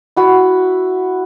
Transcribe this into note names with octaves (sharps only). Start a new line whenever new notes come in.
E4 F#4 B5